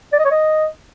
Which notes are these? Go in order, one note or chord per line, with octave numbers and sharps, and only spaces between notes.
D5
D#5
C#5
D#5